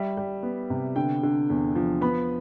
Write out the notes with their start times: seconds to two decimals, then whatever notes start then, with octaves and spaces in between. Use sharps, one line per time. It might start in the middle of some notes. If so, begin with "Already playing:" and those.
Already playing: G3 E5
0.17 G3
0.43 B3
0.70 C3
0.96 D3 G5
1.23 D3
1.50 E2
1.75 F3
2.01 B3 B5